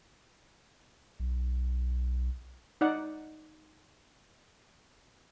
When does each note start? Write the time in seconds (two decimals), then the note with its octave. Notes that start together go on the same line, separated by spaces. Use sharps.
1.20 B1
2.81 D#4 D5 F#5